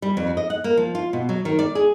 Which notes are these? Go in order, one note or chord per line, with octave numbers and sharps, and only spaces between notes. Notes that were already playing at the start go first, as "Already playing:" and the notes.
G3
F2
D#5
F#5
A#3
F3
F4
B2
F#3
D#3
D5
G#4